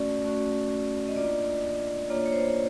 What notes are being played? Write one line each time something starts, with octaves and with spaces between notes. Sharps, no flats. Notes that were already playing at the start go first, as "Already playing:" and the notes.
Already playing: A3 C#4 F#4 D5
A3 C#4 F#4
D#5
A#3 D4 F4 D5
A#3 D4 F4 C#5
C#5
C5